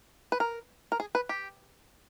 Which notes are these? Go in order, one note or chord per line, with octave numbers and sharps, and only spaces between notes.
B4
A#4
A#4
G#4
B4
G4